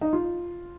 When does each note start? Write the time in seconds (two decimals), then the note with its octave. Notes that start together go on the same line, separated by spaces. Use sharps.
0.01 D#4
0.13 F4